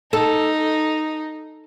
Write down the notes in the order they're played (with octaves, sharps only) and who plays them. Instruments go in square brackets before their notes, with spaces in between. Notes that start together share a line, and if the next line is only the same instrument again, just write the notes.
[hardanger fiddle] D#4 [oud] A4